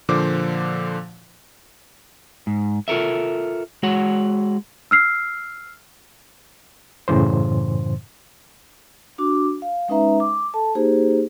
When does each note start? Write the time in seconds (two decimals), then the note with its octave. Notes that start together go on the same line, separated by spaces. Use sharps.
0.09 A#2 D3 F3 C5 D6
2.47 G#2
2.88 F4 A4 A#4 E5
3.83 G#3 F#4 C#5 F#5
4.91 E6 F6 C7
7.08 F#2 A2 C#3 E3 C5
9.18 D4 F#4 D6
9.62 F5
9.88 G#3 C#4 D#4 B4 E5 A#5
10.20 D6
10.54 A4 A5
10.75 A#3 D#4 G4 G#4 C5